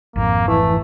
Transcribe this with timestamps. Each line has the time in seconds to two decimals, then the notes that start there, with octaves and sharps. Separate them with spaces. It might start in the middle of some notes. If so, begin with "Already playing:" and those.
0.16 G#1 F2 A#3
0.48 E3 A3